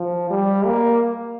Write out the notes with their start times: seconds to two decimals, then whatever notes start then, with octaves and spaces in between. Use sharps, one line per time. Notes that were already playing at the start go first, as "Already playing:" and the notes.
Already playing: F3
0.30 G3
0.66 A#3